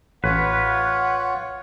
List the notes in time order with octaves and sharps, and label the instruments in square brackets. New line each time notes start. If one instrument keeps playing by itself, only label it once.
[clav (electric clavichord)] A1 [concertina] F4 C#5 [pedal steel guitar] B4 [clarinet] F#5